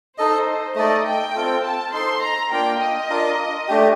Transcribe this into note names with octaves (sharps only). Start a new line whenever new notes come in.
D#4 A4 C5 D#5
A3 D#4 A4 D5 D#5
G5
C4 F4 A4
A5
D#4 A4 C5 C6
A#5
A#3 D4 F4 G5
D#5
D4 F4 A#4
A3 D4 G4